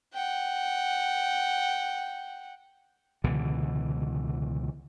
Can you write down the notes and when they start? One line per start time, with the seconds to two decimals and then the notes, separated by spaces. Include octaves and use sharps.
0.14 F#5 G5
3.24 C#2 B2 D3 E3